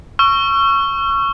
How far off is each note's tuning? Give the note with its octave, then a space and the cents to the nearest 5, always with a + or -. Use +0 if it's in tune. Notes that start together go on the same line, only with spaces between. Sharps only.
C#6 +0 E6 +45